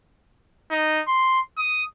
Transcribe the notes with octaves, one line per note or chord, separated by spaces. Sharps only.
D#4
C6
D#6